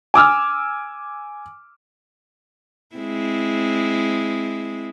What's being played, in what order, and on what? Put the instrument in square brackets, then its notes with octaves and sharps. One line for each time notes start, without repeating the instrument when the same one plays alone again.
[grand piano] G#5 D6 E6 F6
[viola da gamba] G#3 C4 E4